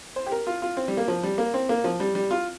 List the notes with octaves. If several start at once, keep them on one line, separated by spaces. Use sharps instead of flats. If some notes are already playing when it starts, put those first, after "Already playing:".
C5
G4
A#4
F4
F4
C4
G3
A#3
F3
G3
A#3
C4
A#3
F3
G3
G3
F4